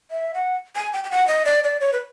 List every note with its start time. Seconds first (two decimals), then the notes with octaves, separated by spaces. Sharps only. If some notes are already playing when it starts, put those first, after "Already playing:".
0.11 E5
0.34 F#5
0.76 G#5
0.93 G5
1.04 G5
1.11 F#5
1.28 D#5
1.45 D5
1.64 D5
1.81 C#5
1.93 B4